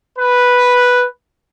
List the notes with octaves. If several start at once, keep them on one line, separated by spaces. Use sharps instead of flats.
B4